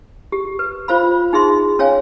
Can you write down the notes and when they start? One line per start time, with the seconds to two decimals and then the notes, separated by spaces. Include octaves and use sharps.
0.32 G4
0.59 B4
0.88 F4 C5 F5 B5
1.33 D#4 G#4 E5 C6
1.79 C#4 C#5 F5 G#5